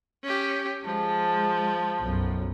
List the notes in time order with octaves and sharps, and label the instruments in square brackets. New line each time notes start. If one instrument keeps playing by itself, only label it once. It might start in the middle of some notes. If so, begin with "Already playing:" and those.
[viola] C#4 G4
[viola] F3 [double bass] G#3 [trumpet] A5
[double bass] B1 F#2